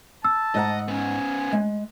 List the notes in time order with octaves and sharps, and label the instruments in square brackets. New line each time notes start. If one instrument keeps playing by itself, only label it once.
[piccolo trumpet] A5 [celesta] E6
[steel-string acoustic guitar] G#2 F#5 A#5 [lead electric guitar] D#5
[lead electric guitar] B3 C#4 [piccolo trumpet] G#5
[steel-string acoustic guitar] G#3